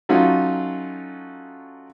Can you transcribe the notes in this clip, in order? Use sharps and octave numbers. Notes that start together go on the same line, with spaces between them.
F#3 A3 C#4 D#4 F4